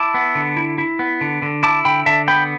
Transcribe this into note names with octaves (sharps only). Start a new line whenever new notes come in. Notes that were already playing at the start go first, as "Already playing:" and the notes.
Already playing: E4 A5 D6
B3
D3
E4
E4
B3
D3
D3
E4 A5 D6
D3 G5 B5
D3 E5 A5
B3 G5 B5